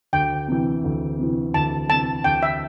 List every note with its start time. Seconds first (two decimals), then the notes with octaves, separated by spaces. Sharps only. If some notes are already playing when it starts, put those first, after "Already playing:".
0.13 D2 G5
0.48 C3 E3
0.84 D2
1.19 C3 E3
1.54 D2 A5
1.89 C3 E3 A5
2.24 D2 G5
2.43 E5